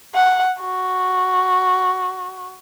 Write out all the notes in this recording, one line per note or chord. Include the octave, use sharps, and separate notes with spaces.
F#5
F#4